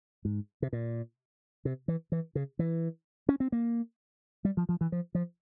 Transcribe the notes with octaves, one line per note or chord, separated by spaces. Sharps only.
G#2
C3
A#2
C3
E3
E3
C#3
E3
C#4
C4
A#3
G3
F3
F3
E3
F3
F3